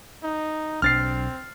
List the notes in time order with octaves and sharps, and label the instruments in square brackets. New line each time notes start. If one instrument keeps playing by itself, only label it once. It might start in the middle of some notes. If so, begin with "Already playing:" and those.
[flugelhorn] D#4
[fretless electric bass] B1 D4 [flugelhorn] C4 [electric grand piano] F6 A6 C7